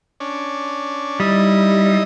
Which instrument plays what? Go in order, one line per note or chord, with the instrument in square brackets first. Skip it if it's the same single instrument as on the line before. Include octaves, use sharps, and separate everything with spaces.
[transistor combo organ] C#4 D4
[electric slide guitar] G3 [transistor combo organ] D#4 E4 D#5